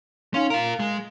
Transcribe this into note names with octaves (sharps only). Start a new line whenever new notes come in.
C#4 D#4 F5 C6
F4 A#4 F5
G#3